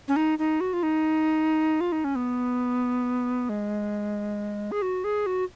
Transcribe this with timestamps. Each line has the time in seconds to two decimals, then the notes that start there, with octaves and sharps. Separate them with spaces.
0.08 C#4
0.16 D#4
0.39 D#4
0.61 F#4
0.73 F4
0.83 D#4
1.81 F4
1.92 D#4
2.04 C#4
2.16 B3
3.49 G#3
4.72 G#4
4.82 F#4
5.04 G#4
5.26 F#4